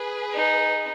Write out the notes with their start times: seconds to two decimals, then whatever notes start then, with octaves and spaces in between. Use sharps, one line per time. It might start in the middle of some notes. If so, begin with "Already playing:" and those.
Already playing: G#4 B4
0.34 D#4